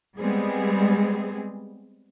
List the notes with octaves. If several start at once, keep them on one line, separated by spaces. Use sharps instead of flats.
G3 G#3 B3 C4 G#4